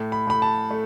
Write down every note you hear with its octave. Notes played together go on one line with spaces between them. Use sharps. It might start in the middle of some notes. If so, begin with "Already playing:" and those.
Already playing: A2
B5
A2 B5
A5
A3